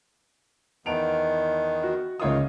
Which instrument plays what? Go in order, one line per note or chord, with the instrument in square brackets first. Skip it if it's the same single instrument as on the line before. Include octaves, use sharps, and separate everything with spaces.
[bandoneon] E2 D#3 B3 [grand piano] A5 D7 F7
[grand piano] F#4
[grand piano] C#2 C#5 D#6 [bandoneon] D#3 E3 F4